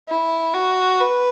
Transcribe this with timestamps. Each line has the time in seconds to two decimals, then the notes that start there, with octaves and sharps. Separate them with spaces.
0.08 E4
0.54 F#4
1.00 B4